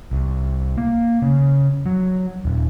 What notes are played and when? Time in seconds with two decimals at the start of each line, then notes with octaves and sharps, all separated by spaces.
0.11 C2
0.78 A#3
1.22 C#3
1.86 F#3
2.45 D#1